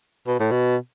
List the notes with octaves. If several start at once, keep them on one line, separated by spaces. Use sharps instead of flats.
B2
A2
B2